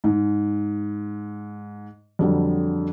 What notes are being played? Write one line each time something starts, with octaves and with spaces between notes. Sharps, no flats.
G#2
F2 D3 F#3 G3